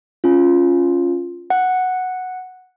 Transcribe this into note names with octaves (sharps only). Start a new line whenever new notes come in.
C#4 F4
F#5